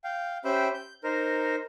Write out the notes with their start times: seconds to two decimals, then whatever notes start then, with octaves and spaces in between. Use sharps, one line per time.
0.04 F5 G5
0.45 C#4 G4 C5 E5 G5 B5
0.74 G6
1.04 D#4 A#4 C5